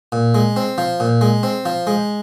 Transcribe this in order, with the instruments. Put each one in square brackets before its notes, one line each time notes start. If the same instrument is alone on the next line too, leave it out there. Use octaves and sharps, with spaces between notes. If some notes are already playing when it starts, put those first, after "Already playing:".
[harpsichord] A#2
G#3
C4
F3
A#2
G#3
C4
F3
G#3